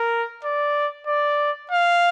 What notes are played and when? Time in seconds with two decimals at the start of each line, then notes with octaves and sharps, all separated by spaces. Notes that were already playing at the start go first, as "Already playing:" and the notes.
Already playing: A#4
0.44 D5
1.07 D5
1.71 F5